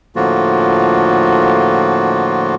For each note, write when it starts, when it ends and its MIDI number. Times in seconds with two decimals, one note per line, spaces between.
0.16 2.55 45
0.16 2.55 50
0.16 2.55 53
0.16 2.55 58
0.16 2.55 65
0.16 2.55 66